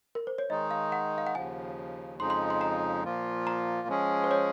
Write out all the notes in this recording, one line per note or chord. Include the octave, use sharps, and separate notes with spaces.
A#4
C5
C#5
D#3 G#3 D#4 D#5
F5
F#5
F5
F#5
D#2 C#3 F3 G#5
F2 C#3 F3 G#3 D#4 C6
C6
C6
A#5
A#2 F3 A#3 F4
A#5
F3 G#3 C#4 G#4
C5
C#5